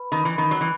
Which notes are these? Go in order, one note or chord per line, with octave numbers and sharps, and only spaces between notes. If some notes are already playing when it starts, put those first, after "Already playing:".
Already playing: B4 B5
D#3 B5
E3
D#3 B5
F#3
E3